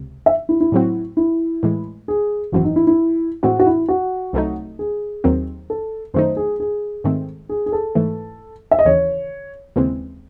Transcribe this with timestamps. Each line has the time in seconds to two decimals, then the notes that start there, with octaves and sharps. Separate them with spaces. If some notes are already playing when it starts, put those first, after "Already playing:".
Already playing: C#2 C3
0.26 E5
0.49 E4
0.61 E4
0.72 A2 F#3 C4 F#4
1.17 E4
1.63 A2 E3 G#3
2.08 G#4
2.52 G#1 F#2 E3 C4 F#4
2.65 D#4
2.76 E4
2.87 E4
3.43 A2 E3 G#3 C4 F#4
3.59 F#4
3.66 E4
3.89 F#4
4.33 C2 C3 F#3 A3 D#4
4.79 G#4
5.24 D#2 D#3 F#3 C4
5.70 A4
6.14 F#2 D#3 A3 D#4 C5
6.37 G#4
6.60 G#4
7.04 G#2 D#3 A3 C4
7.49 G#4
7.66 G#4
7.72 A4
7.95 G#2 E3 A3
8.71 E5
8.79 D#5
8.85 D#2 C#3 E3 C#5
9.76 D#2 C#3 E3 G#3 C4